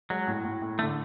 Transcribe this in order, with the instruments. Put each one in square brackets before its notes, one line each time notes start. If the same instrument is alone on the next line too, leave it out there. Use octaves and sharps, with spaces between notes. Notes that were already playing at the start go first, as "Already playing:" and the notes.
[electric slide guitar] F#3 [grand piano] G#3
[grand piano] A2
A2
A2
[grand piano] D3 [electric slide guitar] A3